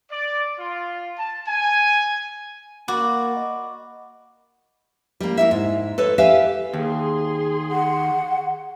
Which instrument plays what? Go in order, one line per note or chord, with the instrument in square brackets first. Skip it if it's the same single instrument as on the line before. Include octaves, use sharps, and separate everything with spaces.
[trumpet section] D5
F4
A5
G#5
[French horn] A#3 [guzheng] F#4 [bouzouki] D5 [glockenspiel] B5 D6
[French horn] D#5
[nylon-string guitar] G3 A#3
A#3 E4 E5
G#2
A4 B4 C#5
G4 B4 E5 F5 G#5
[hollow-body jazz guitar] D#2 [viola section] G#4 C6
[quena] F#5